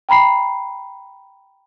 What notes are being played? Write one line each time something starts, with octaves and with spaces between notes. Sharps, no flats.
G5 A#5 B5 C7